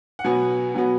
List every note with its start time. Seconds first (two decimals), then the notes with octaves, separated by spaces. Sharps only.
0.19 F#5
0.24 B2 F#3 B3 G#5
0.74 B2 F#3 B3